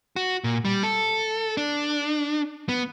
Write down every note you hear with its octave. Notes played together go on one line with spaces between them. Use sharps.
F#4
A#2
G3
A4
D4
B3